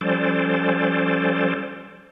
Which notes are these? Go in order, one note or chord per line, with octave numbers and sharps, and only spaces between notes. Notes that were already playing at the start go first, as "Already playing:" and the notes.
F3 G3 C#4 A4 C5 D5